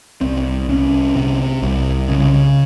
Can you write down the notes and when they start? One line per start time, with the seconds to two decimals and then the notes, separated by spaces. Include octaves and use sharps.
0.21 C2 C4
0.68 C2 C#4
1.16 C3
1.63 C2
2.09 C#3